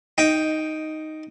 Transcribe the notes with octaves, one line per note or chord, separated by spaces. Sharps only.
D#4 G5